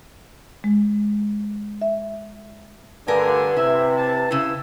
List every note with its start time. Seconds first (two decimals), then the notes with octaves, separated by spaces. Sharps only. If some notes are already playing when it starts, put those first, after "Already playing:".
0.64 G#3
1.82 E5
3.08 G2 D3 A3 A#4 B4 G#5
3.57 C3 E4 E5
3.97 A5
4.31 C#3 E4 E6